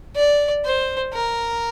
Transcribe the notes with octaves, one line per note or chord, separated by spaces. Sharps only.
D5
C5
A#4